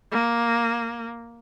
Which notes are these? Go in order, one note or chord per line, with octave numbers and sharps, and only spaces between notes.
A#3